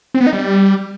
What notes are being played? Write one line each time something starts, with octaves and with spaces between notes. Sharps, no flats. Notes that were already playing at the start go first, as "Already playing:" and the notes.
C4
B3
D#4
G3